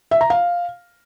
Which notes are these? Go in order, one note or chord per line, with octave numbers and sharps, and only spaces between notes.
E5
A#5
F5